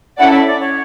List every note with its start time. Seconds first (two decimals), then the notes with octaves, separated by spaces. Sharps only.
0.18 C#4 E4 A4 D5 F#5
0.32 E5
0.46 D5
0.60 C#5